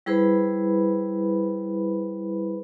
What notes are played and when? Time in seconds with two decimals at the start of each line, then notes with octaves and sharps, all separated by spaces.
0.06 G3 E4 G#4 B4 C5 B5